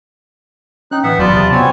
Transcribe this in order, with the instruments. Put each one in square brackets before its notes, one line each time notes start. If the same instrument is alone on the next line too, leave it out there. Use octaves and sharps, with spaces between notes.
[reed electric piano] C#4 G5 [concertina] D#4 F#6
[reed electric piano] A2 E3 [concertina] B3 E5 F#5
[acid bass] E2 [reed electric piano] F#3 B5 [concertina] F4 D5 A5
[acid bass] C3
[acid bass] B3 [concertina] C4 C#5 G#5